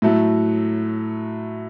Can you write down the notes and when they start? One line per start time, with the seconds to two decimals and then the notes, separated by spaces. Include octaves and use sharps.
0.02 A2 F#3 A3